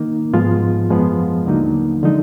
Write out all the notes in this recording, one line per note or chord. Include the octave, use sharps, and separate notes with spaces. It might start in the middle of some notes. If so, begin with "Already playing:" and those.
Already playing: D#3 A#3 D#4
G#2 F3 G#3 B3 F4
F#2 F3 G#3 B3
D#2 D3 F#3 A#3 D#4
D3 F3 G#3 D#4